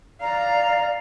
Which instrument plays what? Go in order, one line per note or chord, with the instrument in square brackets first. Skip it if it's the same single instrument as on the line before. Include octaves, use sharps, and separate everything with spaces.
[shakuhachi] D5 [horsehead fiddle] F5 [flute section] A#5